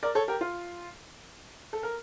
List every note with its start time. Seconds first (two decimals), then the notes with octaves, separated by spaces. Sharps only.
0.03 A#4 D5
0.15 A4 C#5
0.28 G4 A#4
0.41 F4
1.73 A4
1.83 A#4